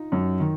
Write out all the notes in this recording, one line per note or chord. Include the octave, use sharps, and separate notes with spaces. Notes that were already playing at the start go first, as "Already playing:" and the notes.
Already playing: D#4 F4
F#2
D#3